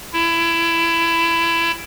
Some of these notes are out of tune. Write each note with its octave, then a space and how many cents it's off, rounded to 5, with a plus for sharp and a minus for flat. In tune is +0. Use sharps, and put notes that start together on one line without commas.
E4 +20